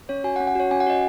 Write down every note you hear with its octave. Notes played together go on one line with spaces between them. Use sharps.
C#4 C#5
F#4 G#5
F#5
C#4
F#5
F#4 C#5
C#4 G#5
F#5
F#4 D#5